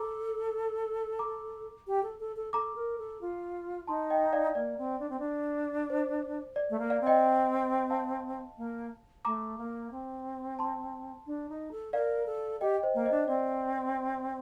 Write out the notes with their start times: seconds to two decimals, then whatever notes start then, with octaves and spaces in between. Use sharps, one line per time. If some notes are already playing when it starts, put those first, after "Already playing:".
Already playing: A4 A#5 D6
1.19 A#5 D6
1.87 G4
2.03 A4
2.20 A4
2.36 A4
2.53 A4 A#5 D6
2.76 A#4
2.98 A4
3.21 F4
3.87 D#4 A5 C6
4.10 D#5 G5
4.33 D5 F5
4.55 A#3 D5
4.78 C4
5.00 D4
5.10 C4
5.19 D4
5.90 C5
6.56 D5
6.70 A3
6.79 A#3
6.90 D5 F5
7.01 C4
7.06 D#5 G5
7.90 F5 A5
8.58 A#3
9.25 A3 A#5 D6
9.58 A#3
9.92 C4
10.59 A5 C6
11.27 D4
11.49 D#4
11.72 A4
11.93 A#4 D5 F5
12.26 A4
12.61 G4 D#5 G5
12.83 C5 D#5
12.94 A#3
13.05 C5 D#5
13.11 D4
13.28 C4 D5